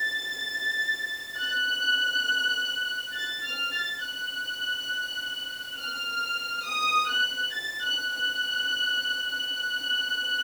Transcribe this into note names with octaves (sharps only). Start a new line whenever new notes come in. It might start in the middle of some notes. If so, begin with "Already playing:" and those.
Already playing: A6
F#6
A6
F6
A6
F#6
F6
D#6
F#6
A6
F#6
F#6
F#6